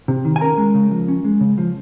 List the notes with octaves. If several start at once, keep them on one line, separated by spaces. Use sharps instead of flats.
C3
D#3
G#5
C#4 A#4 A#5
G#3
C#3
F3
C#4
G#3
C#3
F3